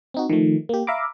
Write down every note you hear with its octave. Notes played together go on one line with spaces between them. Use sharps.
C4 D#4 F#4
D#3 F3 A3
A#3 G4
E5 F5 A#5 B5 D6